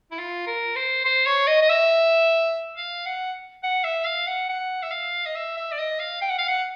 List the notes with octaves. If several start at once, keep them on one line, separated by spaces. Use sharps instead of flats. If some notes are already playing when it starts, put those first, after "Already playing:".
E4
F4
A#4
C5
C5
C#5
D#5
D#5
E5
F5
F#5
F#5
E5
F5
F#5
F#5
E5
F5
D#5
E5
E5
D5
D#5
F5
G5
F#5
F5
F#5